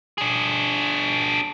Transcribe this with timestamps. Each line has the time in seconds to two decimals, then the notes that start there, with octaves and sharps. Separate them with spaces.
0.18 D4 G#4